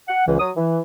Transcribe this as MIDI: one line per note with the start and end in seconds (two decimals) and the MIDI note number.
0.08 0.24 78
0.27 0.39 37
0.27 0.39 52
0.40 0.50 54
0.40 0.50 87
0.56 0.80 52